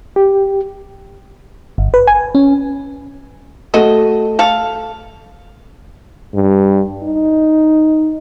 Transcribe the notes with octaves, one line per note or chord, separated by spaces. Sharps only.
G4
G1
B4
G#5
C#4
A3 F#4 D#5
A4 F5
G2
D#4